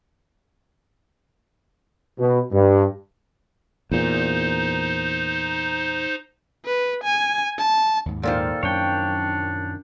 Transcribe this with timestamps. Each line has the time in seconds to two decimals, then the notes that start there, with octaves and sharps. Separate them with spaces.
2.19 B2
2.52 G2
3.91 E2 A#2 D#4 C5
6.66 B4
7.03 G#5
7.58 A5
8.06 D#2 G#2
8.23 A#2 D#3 F3 A4
8.63 F#2 C#4 D4 C#5 G5